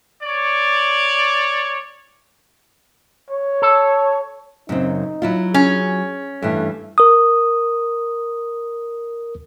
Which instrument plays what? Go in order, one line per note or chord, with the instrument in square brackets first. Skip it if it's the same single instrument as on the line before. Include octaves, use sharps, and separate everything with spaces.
[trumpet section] C#5 D5
[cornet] C#5
[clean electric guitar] A4
[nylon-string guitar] F#2 C#3 C4 [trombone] D#4
[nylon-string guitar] F#3 E4 F4
[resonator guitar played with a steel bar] C#4 [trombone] G#4
[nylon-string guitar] G2 E3 [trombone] A3
[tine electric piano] A#4 D#6